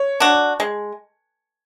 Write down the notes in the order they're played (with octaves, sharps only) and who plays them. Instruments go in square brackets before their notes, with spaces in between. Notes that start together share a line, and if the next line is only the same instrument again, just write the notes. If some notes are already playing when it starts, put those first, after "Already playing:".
Already playing: [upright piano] C#5
[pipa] D4 F#4
G#3